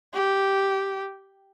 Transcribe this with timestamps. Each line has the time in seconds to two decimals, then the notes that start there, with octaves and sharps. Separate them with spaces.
0.14 G4